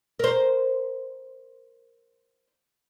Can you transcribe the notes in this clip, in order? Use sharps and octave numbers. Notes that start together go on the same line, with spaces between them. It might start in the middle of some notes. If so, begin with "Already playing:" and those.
A#4 C5